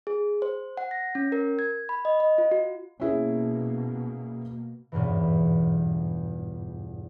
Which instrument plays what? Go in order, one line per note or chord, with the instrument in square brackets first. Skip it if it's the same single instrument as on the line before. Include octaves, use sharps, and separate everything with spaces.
[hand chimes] G#4
C5
F#5
A#6
C#4
A#4
G#6
B5
D#5
D#5
F4
F#4
[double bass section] B2 A#3 [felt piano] C#4 E4 G#4
[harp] G1 E2 G#2 B2 E3